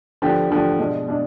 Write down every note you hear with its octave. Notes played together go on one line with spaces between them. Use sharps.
D3 F3 B3 D4 G4
D3 F3 B3 D4 G4
B2 G#3 D4
B2 G#3 D4